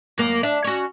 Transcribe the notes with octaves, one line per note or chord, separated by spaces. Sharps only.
F#2 A#3
D4 E5
C#4 F#4